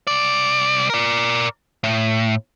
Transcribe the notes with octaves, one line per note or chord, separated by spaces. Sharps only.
C2 D5
A#4 D5
A2